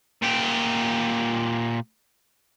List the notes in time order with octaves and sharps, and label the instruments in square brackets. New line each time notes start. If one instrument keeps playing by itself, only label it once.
[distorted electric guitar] A#2 G4